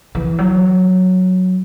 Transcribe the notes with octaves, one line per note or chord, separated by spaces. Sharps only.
E3
F#3